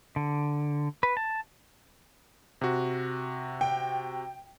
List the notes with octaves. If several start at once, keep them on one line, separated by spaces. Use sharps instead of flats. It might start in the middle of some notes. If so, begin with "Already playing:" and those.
D3
B4
A5
C3 F#4
G5